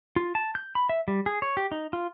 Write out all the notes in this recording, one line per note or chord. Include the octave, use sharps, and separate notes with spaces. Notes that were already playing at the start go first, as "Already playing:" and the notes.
F4
A5
G6
B5
E5
G3
G#4
C#5
G4
D#4
F4